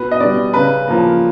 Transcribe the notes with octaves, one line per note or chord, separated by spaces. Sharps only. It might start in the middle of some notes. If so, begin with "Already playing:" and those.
Already playing: B2 B4
D#5
G3 B3 D5
C#3 B4
F3 A#3